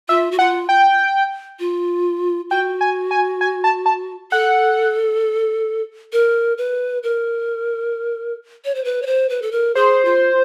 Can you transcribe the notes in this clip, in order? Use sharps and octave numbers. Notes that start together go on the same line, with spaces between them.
F4 E5
F#4
F4 F#5
G5
F4
F#4 G5
G#5
G#5
G#5
A5
A5
A4 F#5
A#4
B4
A#4
C#5
C5
B4
C#5
C5
B4
A4
A#4
G#4 C5
F4